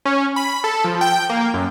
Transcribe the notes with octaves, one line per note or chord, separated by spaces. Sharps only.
C#4
B5
A4
F3
G5
A#3
F#2